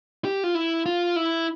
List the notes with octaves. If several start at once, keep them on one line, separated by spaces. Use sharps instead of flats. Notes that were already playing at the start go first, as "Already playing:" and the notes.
G4
F4
E4
F4
E4